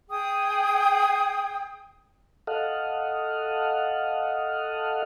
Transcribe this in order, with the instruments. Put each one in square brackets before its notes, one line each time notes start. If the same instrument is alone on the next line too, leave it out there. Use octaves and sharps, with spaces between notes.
[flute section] G#4 G5 D#6
[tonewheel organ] A4 D#5 F5 F#5